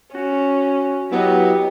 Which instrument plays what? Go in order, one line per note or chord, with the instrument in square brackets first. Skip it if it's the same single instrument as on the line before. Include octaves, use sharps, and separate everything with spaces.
[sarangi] C#4 [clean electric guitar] F#4
[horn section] F#3 B3 [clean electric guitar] E4 D#5 [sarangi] G4